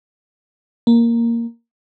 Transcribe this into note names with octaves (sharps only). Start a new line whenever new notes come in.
A#3